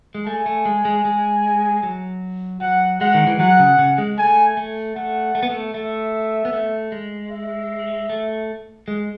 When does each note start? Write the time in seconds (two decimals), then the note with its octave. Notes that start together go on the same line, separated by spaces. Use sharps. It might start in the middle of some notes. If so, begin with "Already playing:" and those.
0.15 G#3
0.26 A3 G#5
0.46 A3
0.65 G#3
0.85 G#3
1.05 G#3
1.83 F#3
2.61 F#3 F#5
3.00 G#3 F#5
3.14 D#3
3.27 E3
3.40 F#3 F#5
3.59 C#3
3.78 C#3
3.98 G#3
4.18 A3 G#5
4.57 A3
4.96 A3 F#5
5.35 A3
5.43 B3
5.50 A3
5.74 A3 E5
6.45 B3
6.53 A3
6.92 G#3
7.31 E5
8.09 A3
8.88 G#3